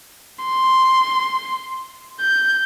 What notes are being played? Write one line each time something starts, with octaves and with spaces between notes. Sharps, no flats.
C6
G6